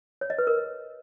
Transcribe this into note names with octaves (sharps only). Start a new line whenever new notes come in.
C#5
D#5
B4
A#4